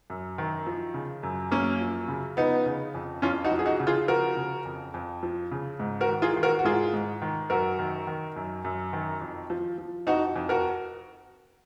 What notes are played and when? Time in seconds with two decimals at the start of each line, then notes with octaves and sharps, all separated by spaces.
0.10 F#2
0.38 D#3
0.66 F3
0.94 C#3
1.23 F#2
1.51 F#2 A#3 C#4
1.81 F3
2.08 C#3
2.37 F3 B3 D#4
2.66 C#3
2.95 F2
3.22 F2 C#4 F4
3.45 D#4 F#4
3.51 F3
3.59 G#4
3.66 D#4 F#4
3.80 C#3
3.87 F4 G#4
4.08 F3 F#4 A#4
4.37 C#3
4.65 F2
4.94 F2
5.23 F3
5.51 C#3
5.80 G#2
6.01 F#4 A#4
6.08 D#3
6.22 F4 G#4
6.36 D#3
6.43 F#4 A#4
6.59 F#4
6.64 G#2 F4 G#4
6.93 G#2
7.22 D#3
7.50 F#2 F#4 A#4
7.79 D#3
8.07 D#3
8.36 F#2
8.65 F#2
8.93 D#3
9.21 F2
9.50 F3
9.78 F3
10.07 F2 D#4 F#4
10.36 F2
10.49 F#4 A#4